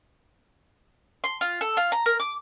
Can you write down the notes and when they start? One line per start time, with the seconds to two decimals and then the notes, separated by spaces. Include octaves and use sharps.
1.24 C6
1.41 F4
1.61 A4
1.77 F4
1.92 A#5
2.06 A#4
2.20 D6